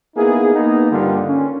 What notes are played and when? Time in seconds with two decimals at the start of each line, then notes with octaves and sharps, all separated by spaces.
0.16 A#3 B3 D#4 E4 G#4
0.54 A#3 B3 D#4
0.91 G2 D3 G3 A#3 D#4 F4
1.28 C#4